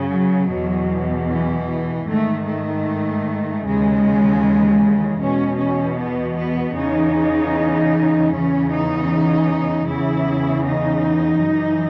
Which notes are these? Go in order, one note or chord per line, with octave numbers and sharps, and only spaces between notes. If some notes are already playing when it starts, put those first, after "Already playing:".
Already playing: F#2 C#3
F#3
E2 B2
E3
G#2 D#3 A3
A3
D#2 C#3 E3 G#3
E2 B2 C#4
C#4
B3
B3
E2 C#3 E3 D#4
E2 C#3 E3 C#4
D#4
E2 C#3 E3 E4
D#4
F#2 E3